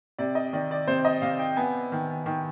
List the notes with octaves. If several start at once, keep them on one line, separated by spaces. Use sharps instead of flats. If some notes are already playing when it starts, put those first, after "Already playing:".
C3 D5
D#5
D#3 D5
D5
C3 C5
D#5
C3 F5
G5
B3 G#5
D#3
D#3